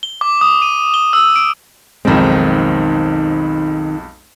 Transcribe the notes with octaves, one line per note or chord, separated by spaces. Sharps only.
G7
D6
D#6
D#7
G7
E6
D7
B1 F2 D#3 G#3 C4